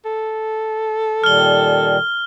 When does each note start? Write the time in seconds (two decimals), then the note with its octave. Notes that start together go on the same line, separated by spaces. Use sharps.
0.05 A4
1.24 A#2 D#3 G3 F6 G7